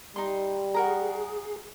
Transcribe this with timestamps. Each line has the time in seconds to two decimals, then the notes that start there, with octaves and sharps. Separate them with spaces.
0.16 G3 D#4 C6
0.74 F#4 G#4 A#4 A#5